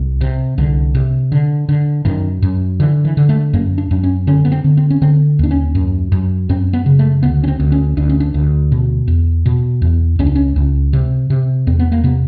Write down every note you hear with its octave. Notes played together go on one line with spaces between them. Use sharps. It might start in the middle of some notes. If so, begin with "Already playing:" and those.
Already playing: C2
C3
C2 D3
C3
D3
D3
F#2 D#3
F#2
D3 E3
E3
D3
A3
F#2 A#3
D4
F#2
C#4
D3 C#4
B3
C4
D3
C4
C#4
D3 C4
D#2 D4
C#4
F#2
F#2
F#2 C4
B3
C#3
A3
D2 B3
C#4
C4
D2
C#4
D2 D4
C#4
D4
D2
B2
E2
B2
E2
C#2 C#4
D4
C#4
C#2
C3
C3
E2 C4
B3
A#3
C3 B3